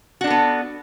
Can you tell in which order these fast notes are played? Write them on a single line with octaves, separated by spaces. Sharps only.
F#4 D4 A4 B3